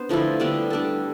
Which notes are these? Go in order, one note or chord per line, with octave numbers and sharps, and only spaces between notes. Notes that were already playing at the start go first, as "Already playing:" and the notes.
Already playing: B3 D4 C5
D3 F3 A3 E4
D3 G3 B3 D4
G3 D4 A4